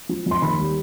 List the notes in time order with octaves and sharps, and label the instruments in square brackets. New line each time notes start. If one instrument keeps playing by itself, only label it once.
[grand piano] F3
F2
C6
D#2 B5
G3